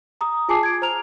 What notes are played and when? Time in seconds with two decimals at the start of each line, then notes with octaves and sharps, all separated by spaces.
0.21 A#5 D#6
0.48 F4 G#4 G#5 A5 D6 C7
0.63 G#6 D7
0.82 C5 A#5 F6 F7